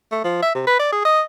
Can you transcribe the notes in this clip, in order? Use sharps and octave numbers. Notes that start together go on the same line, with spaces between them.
A3
F3
E5
C3
B4
D5
G#4
D#5